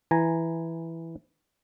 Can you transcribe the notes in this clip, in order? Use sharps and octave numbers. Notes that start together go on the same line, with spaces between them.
E3 G#5 A#5